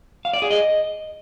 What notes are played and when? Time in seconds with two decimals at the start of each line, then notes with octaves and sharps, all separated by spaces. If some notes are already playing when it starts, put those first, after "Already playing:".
0.25 F5
0.33 D5
0.42 G#4
0.51 D#5